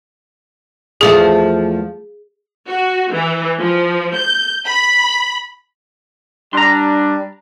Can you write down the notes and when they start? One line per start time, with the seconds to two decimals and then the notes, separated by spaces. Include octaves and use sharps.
1.01 E2 F3 A3 G#4
2.67 F#4
3.11 E3
3.59 F3
4.15 G6
4.67 B5
6.53 G3 D4 A#5 C6